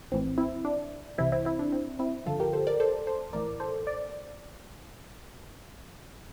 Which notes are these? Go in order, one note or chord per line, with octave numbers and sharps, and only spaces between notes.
A#1 A2 E3 C4
C4 E4
D4
C2 C3 E3 C4 E4
C4 E4
C4 E4
D4
C4
C4 E4
G1 F2 D3 F4 A4
G4 A#4
A4 C5
A#4 D5
A4 C5
A4 C5
A#1 A2 E3 A#4 D5
A4 C5
D5